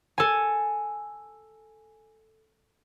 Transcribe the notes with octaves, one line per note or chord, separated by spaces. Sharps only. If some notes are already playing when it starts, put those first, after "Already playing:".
A4 G#5